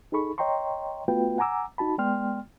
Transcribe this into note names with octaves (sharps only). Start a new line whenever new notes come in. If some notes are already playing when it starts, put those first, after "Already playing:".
D#4 G#4 A4 B5 C#6
C#5 D#5 G5 A#5 C6 C#6
A3 B3 F4 F#4 B4 G5
F#5 G#5 A#5 D6 E6
D#4 F#4 A5 B5
G#3 B3 D5 G5 C6 F6